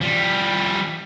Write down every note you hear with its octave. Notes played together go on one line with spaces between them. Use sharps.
F3 G3